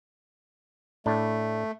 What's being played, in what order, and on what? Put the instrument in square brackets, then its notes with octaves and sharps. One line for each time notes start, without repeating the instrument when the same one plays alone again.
[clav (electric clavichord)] A2 D4 [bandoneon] A3